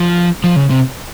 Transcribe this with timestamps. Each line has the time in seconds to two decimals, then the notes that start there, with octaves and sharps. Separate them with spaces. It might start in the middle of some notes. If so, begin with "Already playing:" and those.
Already playing: F3
0.44 F3
0.56 C#3
0.70 C3